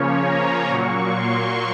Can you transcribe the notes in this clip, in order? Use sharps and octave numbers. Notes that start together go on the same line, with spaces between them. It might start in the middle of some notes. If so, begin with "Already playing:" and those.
Already playing: C#3 F3 A#3 C#4 C#5
A#5
A#2 F#3 A#3 C#6
C6